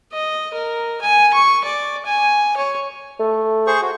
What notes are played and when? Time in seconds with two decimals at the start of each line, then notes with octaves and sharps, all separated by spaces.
0.13 D#5
0.53 A#4
1.01 G#5
1.33 C#6
1.65 D5
2.06 G#5
2.57 C#5
3.20 A3
3.67 G#4 C5 C#6
3.82 F#4